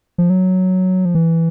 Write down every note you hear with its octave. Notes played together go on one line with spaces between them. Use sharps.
F3
F#3
F3
E3